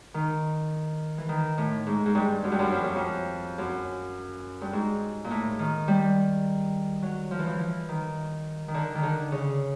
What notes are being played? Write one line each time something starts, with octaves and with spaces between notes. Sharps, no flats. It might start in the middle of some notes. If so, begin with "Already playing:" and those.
D#3
E3
D#3
A2
G#2
G#2
G2
F#2
G2
F#2
F2
F#2
F2
F#2
G2
G#2
A#2
A2
D#3
G3
F#3
F3
E3
F3
E3
D#3
D#3
D3
D#3
D3
C#3